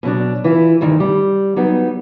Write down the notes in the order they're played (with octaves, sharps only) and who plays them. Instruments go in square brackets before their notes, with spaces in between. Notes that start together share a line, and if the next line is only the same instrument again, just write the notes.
[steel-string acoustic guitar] B2 F#3 D4
E3 E4 F4
D2 G2 D#3
G3
F#3 G3 B3 D#4